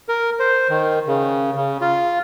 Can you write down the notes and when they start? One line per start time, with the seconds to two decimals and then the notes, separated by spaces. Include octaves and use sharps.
0.09 A#4
0.40 C5
0.69 D#3
1.07 C#3
1.56 C#3
1.81 F4